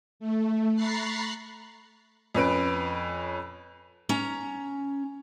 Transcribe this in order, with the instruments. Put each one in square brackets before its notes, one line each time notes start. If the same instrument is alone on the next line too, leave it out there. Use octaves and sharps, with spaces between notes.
[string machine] A3
A#5 B5 C#6 F#6 A6 C7
[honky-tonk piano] F2 C#4 B4 D7
[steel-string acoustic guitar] C#4 A#5